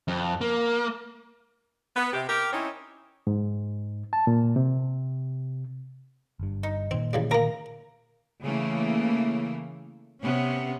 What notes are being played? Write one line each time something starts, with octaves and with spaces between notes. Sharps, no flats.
F2
A#3
B3
C3 G4
G4 A#4
C4 C#4 D#4 E4 C#5
G#2
A5
A#2
C3
G1 G2
D#4
A#2 D#3 C4
A1 C#3 G3
D2 A#3 A#4 A#5
C#3 E3 A3 A#3
C3 B3 C#4